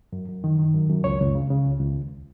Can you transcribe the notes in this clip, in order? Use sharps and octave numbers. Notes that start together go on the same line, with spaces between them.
F#2
F#2
D#3
D#3
F#2
F#2
C#2 C#5
C#2
C#3
C#3
C#2
C#2
D#2